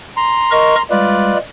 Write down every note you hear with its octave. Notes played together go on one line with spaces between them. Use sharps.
A#5 C6
A#4 D#5 C#6
G3 G#3 F4 B4 D5